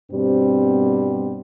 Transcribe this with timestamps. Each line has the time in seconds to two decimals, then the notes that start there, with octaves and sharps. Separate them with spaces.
0.11 G2 B2 G3 B3 C4